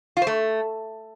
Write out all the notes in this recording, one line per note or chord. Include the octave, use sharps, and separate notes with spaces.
F4
C5
A3